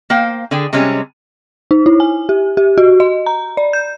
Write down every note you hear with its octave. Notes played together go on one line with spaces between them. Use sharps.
A#3 C5 F5 G5
D3 G#4 D5 G5
C3 G3 G#3 C4 C#4
D#4
E4
G#5
G4
G4
F#4
D#5
A#5
D5
G6